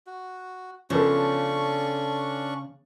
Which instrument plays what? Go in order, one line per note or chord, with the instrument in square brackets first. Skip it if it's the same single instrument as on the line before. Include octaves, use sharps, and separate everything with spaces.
[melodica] F#4
[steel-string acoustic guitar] C#3 [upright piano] F3 B3 A4 [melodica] C#4 D4 C#6